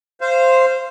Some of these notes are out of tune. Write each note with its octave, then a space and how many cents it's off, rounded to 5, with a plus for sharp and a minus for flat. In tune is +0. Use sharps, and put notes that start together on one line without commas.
C5 +0 F5 -25